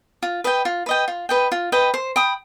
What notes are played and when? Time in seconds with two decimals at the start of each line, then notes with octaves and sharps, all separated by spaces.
0.23 F4
0.44 B4 D#5 G5
0.65 F4
0.86 B4 D#5 G5
1.08 F4
1.29 B4 D#5 G5
1.52 F4
1.72 B4 D#5 G5
1.94 C5
2.16 G5 B5 D#6